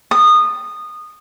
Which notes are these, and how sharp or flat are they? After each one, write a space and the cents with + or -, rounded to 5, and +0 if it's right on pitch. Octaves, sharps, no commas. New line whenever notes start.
D#6 -20